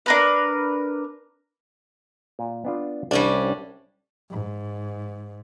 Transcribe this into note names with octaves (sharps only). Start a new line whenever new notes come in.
D4 A#4 B4
A#2
B3 D4 F4
C2 G3 C#4 D4
G#2